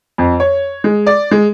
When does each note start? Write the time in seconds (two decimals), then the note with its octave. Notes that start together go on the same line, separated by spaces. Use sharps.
0.18 F2
0.40 C#5
0.84 G#3
1.06 D5
1.31 G#3